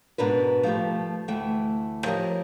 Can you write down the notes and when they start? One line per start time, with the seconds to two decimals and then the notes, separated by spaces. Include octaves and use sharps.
0.18 G#2 B2 D4 A#4 B4
0.63 F3 G3 A3 G4
1.28 D2 E3 A3 G5
2.05 F3 G4 A#4 C#5 D#5